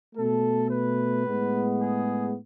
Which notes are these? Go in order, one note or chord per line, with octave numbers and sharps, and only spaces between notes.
B2 A3 A4
B4
A2 G#3 B3
G#4